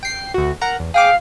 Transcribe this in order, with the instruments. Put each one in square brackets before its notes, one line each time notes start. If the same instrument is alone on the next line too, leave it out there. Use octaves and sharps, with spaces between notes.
[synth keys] G5 C7
D2 F#4
A#4 F#5 A#5
E2
[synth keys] G#4 G5 D6 [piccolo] F5